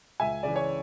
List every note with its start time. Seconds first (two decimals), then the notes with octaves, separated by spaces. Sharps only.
0.20 C#2 E5 G#5
0.43 C#3 E3 D5
0.56 C#5